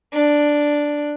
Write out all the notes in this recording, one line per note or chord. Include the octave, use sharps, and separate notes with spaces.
D4